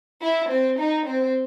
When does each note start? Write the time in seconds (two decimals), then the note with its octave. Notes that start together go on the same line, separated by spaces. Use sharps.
0.22 E4
0.50 C4
0.78 D#4
1.07 C4